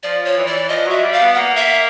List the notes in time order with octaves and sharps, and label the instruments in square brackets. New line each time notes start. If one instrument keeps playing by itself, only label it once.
[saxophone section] F3 [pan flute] D5
[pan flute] C#5
[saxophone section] E3
[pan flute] D5
[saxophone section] F3 [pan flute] D#5
[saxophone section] F#3
[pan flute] E5
[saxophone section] G3
[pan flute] F5
[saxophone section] B3
[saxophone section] A#3 [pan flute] F#5
[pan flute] E5